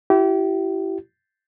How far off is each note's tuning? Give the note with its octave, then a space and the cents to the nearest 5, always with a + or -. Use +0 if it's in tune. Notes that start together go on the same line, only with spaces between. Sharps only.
E4 +20 G4 -35